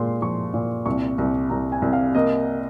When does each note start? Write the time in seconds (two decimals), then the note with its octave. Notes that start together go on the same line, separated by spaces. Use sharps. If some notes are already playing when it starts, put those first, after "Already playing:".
Already playing: A#2 G#3 C6
0.22 F3 C#6
0.54 A#2
0.86 C2 C#6
1.18 C2
1.50 C2 A#5
1.72 G#5
1.82 C2
1.93 F5
2.15 A#3 D#5